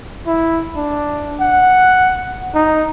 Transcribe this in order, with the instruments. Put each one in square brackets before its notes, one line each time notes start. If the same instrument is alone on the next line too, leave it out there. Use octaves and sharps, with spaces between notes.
[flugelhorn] E4
D4
F#5
D#4